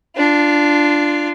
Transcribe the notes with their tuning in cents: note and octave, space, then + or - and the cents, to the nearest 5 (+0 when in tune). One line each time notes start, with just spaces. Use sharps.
D4 +0 F4 -15